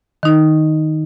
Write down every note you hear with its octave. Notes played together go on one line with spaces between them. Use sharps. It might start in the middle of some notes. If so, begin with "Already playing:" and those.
D#3 D#4